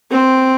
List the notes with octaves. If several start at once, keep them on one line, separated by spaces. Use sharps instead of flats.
C4